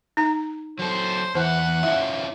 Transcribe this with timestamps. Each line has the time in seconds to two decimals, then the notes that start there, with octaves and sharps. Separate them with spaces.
0.17 D#4 A#5
0.79 F#3 A4 C5
1.35 E2 E3 E4 C5 F#5
1.83 C#4 E4 F4 E5